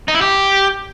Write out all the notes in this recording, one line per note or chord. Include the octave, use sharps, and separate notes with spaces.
D#4
E4
G4